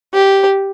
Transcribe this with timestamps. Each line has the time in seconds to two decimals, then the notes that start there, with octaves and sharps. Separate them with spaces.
0.14 G4